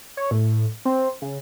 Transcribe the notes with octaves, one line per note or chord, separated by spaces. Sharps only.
C#5
A2
C4
C#3